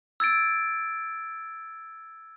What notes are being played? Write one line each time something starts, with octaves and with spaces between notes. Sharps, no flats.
E6 G#6 A6 D7